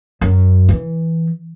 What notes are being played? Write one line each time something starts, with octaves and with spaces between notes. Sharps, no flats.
F#2
E3